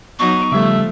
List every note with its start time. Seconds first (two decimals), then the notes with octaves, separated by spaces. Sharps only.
0.19 F#3 B3 D#4 C#6
0.52 C#3 F3 G3 A3 E5